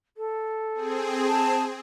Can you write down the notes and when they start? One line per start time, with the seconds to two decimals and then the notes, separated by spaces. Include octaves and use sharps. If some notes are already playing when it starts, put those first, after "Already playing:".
0.17 A4
0.74 C4 G#4
1.27 A5